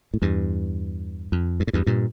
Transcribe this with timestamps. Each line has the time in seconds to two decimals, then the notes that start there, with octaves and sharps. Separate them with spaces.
0.14 A2
0.22 E2 G2
1.32 F2
1.60 G2
1.67 A2
1.73 E2 G2
1.87 G2 A#2